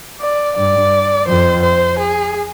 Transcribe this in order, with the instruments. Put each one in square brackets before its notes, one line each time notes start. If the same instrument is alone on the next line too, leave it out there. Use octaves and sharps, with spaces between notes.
[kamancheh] D5
[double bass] G2 [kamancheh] D5
[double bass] F2 [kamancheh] C5
[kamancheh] C5
G#4